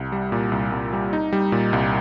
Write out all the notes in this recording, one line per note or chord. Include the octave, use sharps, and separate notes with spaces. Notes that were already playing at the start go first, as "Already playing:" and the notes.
Already playing: C2
G3
A#2
C2
C2
G3
D#4
G3
A#2
C2